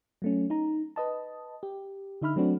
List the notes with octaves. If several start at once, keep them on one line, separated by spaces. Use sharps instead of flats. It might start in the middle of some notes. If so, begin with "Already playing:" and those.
F#3 A3 C#4
D#4 A#5
B4 D#5 A5
G4
D3 D#4 E5 B5 F6
F#3 A3 C4 D4 F#4